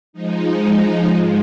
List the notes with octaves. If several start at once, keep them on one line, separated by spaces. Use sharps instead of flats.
F3 G#3 D#4
G#2 F3 G#3